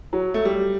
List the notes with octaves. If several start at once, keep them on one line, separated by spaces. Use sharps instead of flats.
F#3
A3
G3